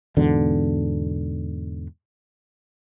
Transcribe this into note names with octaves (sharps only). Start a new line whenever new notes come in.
E2 G#2 B2 D3